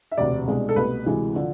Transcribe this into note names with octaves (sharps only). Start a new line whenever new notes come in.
E5
E1 D2 C3 D5
C2 B2 G#3 D4
A4
C2 B2 A3 B4
D2 C3 E3 G#3
D3 F3